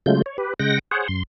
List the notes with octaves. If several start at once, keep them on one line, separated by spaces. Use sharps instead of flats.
C#3 F#3 G#3 A3 F4 G6
C#5
G4 B4
C#3 G#3 F#5 G5 A#6
G#4 C5 C#5 F#5
F#2 C6